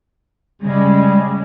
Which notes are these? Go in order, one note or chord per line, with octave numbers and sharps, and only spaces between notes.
C#3 G3 G#3